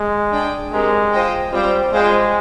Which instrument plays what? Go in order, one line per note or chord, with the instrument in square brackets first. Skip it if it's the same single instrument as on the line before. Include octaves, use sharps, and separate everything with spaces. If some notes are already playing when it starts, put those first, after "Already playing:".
Already playing: [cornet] G#3
[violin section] D4 G#4 D5 G5
[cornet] G#3 [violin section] C4 G4 A#4
[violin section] F4 C5 D#5 G5
[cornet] G3 [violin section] C4 F4 C5 G5
[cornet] G#3 [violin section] F4 G#4 C5 G5